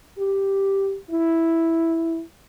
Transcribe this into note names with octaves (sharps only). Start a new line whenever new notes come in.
G4
E4